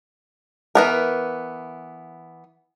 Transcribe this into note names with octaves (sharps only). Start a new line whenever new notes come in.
E3 B3 A#4